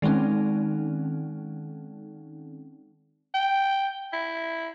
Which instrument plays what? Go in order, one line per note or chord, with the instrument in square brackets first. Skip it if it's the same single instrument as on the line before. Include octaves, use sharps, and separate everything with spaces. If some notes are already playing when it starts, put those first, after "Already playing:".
[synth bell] D#3 G#3 C4 C#4 D#4
[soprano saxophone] G5
E4